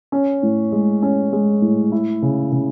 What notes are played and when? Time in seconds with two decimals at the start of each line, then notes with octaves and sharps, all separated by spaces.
0.12 C#4
0.43 A2
0.72 G#3
1.02 C#4
1.33 G#3
1.62 A2
1.92 E4
2.22 C#3
2.52 C#3